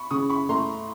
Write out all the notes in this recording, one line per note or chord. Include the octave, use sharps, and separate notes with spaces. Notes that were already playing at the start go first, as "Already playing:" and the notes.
Already playing: B5 C#6
C#3 C#6 D#6
B5 C#6
A3 A#5 C6